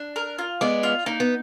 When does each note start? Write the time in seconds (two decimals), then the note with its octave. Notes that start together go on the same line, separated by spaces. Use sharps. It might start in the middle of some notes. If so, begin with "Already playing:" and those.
Already playing: D4
0.16 A#4
0.39 F4
0.61 G#3 B3 D5
0.83 F4
1.06 A#3 D#4
1.20 B3